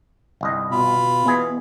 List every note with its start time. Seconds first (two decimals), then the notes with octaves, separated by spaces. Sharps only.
0.41 G1 C2 D#5
0.72 B2 F4 B5
1.26 B2 E3 B3 G#4